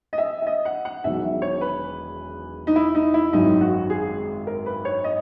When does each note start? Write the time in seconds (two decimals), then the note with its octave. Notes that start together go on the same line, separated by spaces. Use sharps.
0.13 D#5
0.18 E5
0.42 E5
0.47 D#5
0.65 F#5
0.85 F#5
1.04 E1 E2 D#3 F#3 E5
1.42 C#5
1.61 B4
2.67 D#4
2.76 E4
2.95 D#4
3.14 E4
3.33 G#1 F#2 D#3 F#3 D#4
3.61 F#4
3.90 G#4
4.47 A#4
4.66 B4
4.85 C#5
5.04 D#5